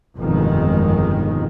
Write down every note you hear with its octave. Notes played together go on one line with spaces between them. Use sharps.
G1 F2 B2 D#3 G#3